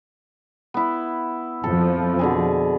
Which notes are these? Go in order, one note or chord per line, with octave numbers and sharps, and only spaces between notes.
B3 E4
F2 F3 A4
B2 D3 G#4